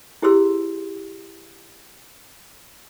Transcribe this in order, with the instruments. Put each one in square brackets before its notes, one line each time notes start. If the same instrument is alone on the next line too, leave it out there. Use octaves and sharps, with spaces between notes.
[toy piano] E4 G4 G#4 C5 C6 E6